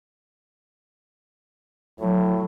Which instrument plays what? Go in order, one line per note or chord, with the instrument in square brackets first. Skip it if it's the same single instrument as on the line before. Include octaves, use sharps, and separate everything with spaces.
[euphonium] A2 [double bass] F#3